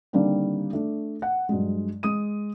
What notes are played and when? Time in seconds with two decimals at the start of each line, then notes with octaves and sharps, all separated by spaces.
0.13 D3 D#3 G3 A#3 C4 D4
0.73 A3 D4
1.22 F#5
1.49 G2 F#3 G#3
2.03 G#3 D#6 D#7